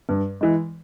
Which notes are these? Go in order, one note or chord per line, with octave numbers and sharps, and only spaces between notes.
G2
E3 G#3